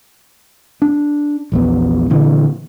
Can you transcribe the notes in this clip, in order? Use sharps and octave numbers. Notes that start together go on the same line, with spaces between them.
D4
A#1 E2 B3
A#2 D3 E3